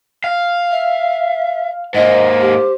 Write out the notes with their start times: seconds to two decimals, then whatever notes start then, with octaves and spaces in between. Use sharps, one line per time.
0.24 F5
0.71 E5
1.94 G#2 A#3 C5 D#5
2.41 G4